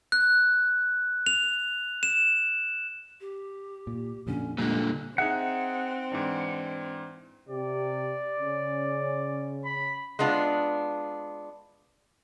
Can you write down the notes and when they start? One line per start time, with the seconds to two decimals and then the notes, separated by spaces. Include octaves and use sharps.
0.12 F#6
1.26 F7
2.03 E7
3.21 G4
3.87 A#2
4.27 F2 A#2 D3 C#4
4.58 A#2 D3 G3 G#3
5.18 C4 D#4 G#4 E5 F#5
6.12 G#2 E3 D4
7.48 C3 G4 D5
8.39 C#3 C#4
9.65 B5
10.19 G#3 B3 D4 F4